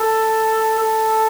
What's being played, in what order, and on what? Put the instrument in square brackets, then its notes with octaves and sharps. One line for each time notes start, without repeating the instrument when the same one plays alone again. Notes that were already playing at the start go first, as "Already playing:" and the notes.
Already playing: [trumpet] A4
A4